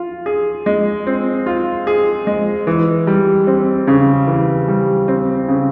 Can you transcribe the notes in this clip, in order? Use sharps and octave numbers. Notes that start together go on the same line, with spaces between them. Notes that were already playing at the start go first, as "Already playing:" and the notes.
Already playing: F4
G#4
G#3
C4
F4
G#4
G#3
E3
G3
C4
C#3
E3
G3
C4
C#3